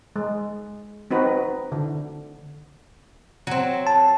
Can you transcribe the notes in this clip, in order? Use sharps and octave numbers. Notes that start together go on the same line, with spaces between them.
G#3
C4 D#4 F#4 B4
D3
F#3 C4
A5